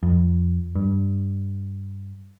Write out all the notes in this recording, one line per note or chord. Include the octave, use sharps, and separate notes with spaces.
F2
G2